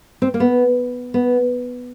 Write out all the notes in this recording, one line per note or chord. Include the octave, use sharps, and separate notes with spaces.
C4
A#3
B3
B3